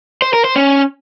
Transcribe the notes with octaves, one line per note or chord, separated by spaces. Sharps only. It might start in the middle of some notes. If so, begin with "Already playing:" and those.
C5
A#4
C5
C#4